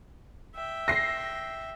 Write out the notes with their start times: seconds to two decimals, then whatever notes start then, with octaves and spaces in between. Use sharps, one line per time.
0.55 E5 G5
0.88 A#6 C7